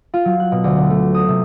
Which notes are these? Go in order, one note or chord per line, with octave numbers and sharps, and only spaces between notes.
F4
F#3
F#6
B2
D2
D3
A3
D#6
C3